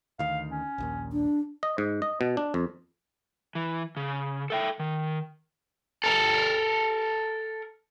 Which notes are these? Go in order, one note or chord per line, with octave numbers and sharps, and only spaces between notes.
D2 D#3 F5
C#4
A#1 D#2 A#2
D4
D#5
G#2
D#5
B2
D4
F2
E3
C#3
A4 E5 G5
D#3
A4 A#4